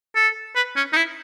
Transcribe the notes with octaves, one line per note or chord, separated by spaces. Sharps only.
A4
B4
C#4
D#4
E4